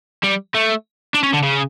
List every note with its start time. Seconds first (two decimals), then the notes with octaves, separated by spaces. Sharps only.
0.24 G3
0.55 A3
1.14 D4
1.23 C#4
1.33 D3
1.43 C#3